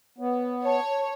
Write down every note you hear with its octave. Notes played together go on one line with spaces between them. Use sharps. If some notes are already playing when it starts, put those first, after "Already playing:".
B3 C#5
C#5 A5